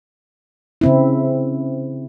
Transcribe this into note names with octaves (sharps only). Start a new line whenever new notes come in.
C#3 C4 E4